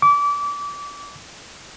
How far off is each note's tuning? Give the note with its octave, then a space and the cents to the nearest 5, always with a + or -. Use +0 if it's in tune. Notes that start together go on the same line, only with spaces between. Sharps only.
D6 -30